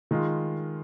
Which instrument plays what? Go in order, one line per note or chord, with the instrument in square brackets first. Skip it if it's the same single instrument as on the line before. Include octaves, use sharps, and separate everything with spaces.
[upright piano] D#3 G#3 F4